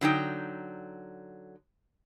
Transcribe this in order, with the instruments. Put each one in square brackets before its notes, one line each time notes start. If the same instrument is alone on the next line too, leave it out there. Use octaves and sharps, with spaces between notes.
[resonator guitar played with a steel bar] D3 F#3 D#4 G5